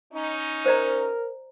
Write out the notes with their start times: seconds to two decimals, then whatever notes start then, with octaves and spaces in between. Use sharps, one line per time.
0.13 C#4 D#4
0.66 A#4 C5 D5 A#5